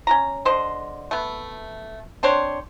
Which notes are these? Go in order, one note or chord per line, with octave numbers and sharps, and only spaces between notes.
C#4 F#4 A#5
D3 C5 D#5
A3 B3
C4 D4 C5 C#5